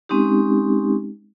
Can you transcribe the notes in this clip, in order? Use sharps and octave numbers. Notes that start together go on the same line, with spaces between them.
G#3 C4 C#4 D#4 G4